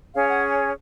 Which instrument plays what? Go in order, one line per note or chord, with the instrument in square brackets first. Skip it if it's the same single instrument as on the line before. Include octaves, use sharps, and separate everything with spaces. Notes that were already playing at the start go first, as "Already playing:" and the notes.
[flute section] C#4 G#4 C#5 F5
F#5